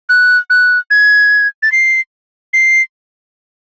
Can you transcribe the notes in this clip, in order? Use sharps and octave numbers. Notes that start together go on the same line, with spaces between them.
F#6
F#6
G#6
A6
C7
C7